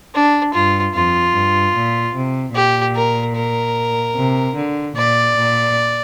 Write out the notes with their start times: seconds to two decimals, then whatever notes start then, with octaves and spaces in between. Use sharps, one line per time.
0.15 D4
0.54 G2 F4
0.94 F2 F4
1.34 G2
1.76 A#2
2.15 C3
2.55 A#2 G4
2.96 A#4
3.36 A#4
4.15 C3
4.56 D3
4.96 A#2 D5
5.37 A#2